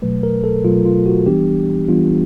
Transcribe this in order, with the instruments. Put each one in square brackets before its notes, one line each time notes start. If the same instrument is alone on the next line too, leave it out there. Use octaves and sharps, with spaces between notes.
[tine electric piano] B2 F#3 A3 B4
A#4
A4
B2 F#3 A3 F4
F4
F#4
E3 G3 B3 D4 G4
E3 G3 B3 D4 F4